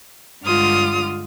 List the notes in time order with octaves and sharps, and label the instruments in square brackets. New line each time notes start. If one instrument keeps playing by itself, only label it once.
[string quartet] G2 D3 G#3 F4 D#6 F6